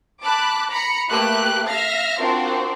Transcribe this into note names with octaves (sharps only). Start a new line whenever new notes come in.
A5 B5 D6 F#6
A#5 B5 C#7
A3 A#3 G4 B4 F#6
E5 F5 F6 A#6
C4 D4 F4 F#4 A#4 C5